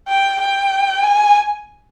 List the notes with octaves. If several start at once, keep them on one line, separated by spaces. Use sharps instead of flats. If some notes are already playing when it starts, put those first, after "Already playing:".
G5
G5
G#5